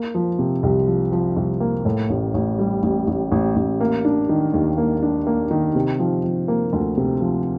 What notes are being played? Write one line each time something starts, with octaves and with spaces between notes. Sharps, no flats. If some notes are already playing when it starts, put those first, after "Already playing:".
Already playing: A#3
F3
C3
C2
F3
F3
C2
A#3
A2
A1
A1
G3
A1
A1
A1
A1
A#3
D4
D#3
D#2
A#3
D4
A#3
D#3
C3
F3
F3
A#3
D2
C3
F3